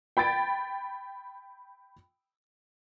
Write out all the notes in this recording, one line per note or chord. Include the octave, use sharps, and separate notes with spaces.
G5 B5 G#6 A6 D7